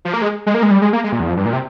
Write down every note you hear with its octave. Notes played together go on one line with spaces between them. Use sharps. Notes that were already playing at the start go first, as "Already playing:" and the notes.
F3
A#3
G#3
G#3
A#3
G#3
G3
G#3
A#3
G#3
A#2
E2
F2
G2
A#2
C3